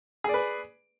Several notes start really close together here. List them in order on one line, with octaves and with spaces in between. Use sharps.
G#4 D5 B4